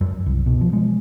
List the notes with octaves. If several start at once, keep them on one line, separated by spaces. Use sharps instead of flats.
F#2
C2
B2
F3
G#3